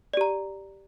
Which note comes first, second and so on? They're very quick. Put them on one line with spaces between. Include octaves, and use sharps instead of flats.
D5 G4 A#5